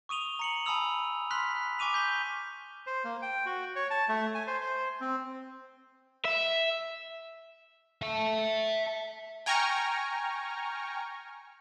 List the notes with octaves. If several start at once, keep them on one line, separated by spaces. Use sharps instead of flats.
C#6 D#6 D#7 F7 G7
A#5 C#7 F#7
G#5 A5 B5 D#6 E6 F7
B5 C6 F6 F#6 B6
G#5 C#6 D6 D#7 F7
D6 G6 B6 G7
C5
A#3
G5
F#4
C#5
A5
A3
G#5
C5
C5
C4
E5
E5 A5
G5 G#5 A#5 C#6 F6